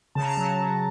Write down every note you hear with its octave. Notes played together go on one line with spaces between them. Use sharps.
C#3 A5
A#5
A5
F#3
F#3